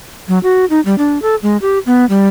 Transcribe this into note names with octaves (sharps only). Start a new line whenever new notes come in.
F#3
F#4
D#4
G3
D4
A4
G#3
G4
B3
G3